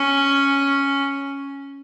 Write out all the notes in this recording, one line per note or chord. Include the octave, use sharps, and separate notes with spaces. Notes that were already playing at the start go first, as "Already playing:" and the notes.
Already playing: C#4